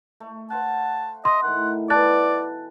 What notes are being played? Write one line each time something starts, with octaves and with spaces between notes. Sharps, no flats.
A3
C5 F5 F#5 A5
D#5 C6
A2 D#3 F#5
B2 E3 D5 A5 F#6 A6